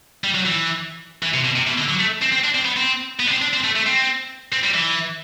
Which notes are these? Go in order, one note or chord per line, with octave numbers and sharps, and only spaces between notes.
G3
F#3
E3
E3
C3
B2
C3
B2
D3
F#3
A3
C4
C4
D4
C4
B3
C4
B3
D4
C4
D4
C4
A3
A3
C4
C4
G3
E3